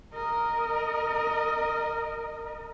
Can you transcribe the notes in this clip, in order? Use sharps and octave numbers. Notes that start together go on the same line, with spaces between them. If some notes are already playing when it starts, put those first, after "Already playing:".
A#4 D#5